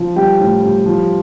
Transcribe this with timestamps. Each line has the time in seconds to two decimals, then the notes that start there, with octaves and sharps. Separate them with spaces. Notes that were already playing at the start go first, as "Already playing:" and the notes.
Already playing: F3
0.16 G3 G5
0.40 A2
0.63 G3
0.86 F3